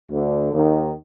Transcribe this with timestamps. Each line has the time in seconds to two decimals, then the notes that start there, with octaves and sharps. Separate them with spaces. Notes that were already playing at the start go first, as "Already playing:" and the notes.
0.11 D2 D3
0.54 D#2 D#3